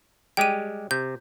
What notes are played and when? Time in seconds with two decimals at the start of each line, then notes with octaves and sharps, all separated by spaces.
0.37 G3 G#3 G4 G5 D#7
0.91 C3 G6